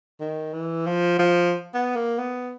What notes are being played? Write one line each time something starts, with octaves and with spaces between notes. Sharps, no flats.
D#3
E3
F3
F3
B3
A#3
B3